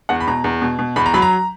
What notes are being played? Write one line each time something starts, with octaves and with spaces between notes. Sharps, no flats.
E2 F#5
B5
B2 A#5
E2
B2
B2
E2 B5
A#5
F#3 B5
A#5